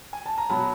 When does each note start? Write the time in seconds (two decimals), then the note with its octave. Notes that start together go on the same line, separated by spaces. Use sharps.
0.13 G#5
0.26 A5
0.38 A#5
0.50 B2 F#3 A5 B5